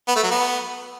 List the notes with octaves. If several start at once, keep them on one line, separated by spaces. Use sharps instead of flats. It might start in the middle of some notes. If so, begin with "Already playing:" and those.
B3
A3
F#3
B3